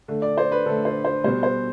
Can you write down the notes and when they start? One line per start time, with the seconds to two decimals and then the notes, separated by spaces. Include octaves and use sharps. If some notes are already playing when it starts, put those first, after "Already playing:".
0.08 D3 A3
0.22 D5
0.38 C5
0.52 B4
0.65 D3 A3 A4
0.85 C5
1.05 C5
1.24 B2 G3 C5
1.43 C5